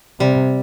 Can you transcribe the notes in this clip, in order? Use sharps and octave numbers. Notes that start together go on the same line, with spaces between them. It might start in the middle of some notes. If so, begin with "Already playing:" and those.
C3 G3